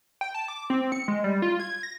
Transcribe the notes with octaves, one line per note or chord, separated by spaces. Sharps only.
G5
A5
D6
C4
C#7
G#3
G3
F4
G#6
A#6